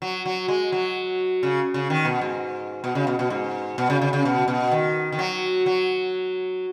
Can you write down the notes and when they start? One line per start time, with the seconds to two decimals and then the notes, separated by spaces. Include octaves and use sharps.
0.02 F#3
0.26 F#3
0.48 G#3
0.72 F#3
1.43 C#3
1.74 C#3
1.90 D#3
2.05 B2
2.21 G#2
2.84 B2
2.95 C#3
3.07 B2
3.19 B2
3.30 G#2
3.78 B2
3.90 C#3
4.01 C#3
4.13 C#3
4.25 B2
4.48 B2
4.72 D#3
5.12 D#3
5.19 F#3
5.66 F#3